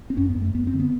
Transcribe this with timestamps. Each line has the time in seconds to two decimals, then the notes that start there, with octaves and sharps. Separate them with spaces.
0.10 C4
0.17 F#2 C#4
0.29 B3
0.36 F#2
0.42 A3
0.55 F#2 B3
0.67 C4
0.74 D3
0.80 B3